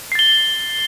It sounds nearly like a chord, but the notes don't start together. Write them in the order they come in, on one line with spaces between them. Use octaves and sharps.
C7 A6 G7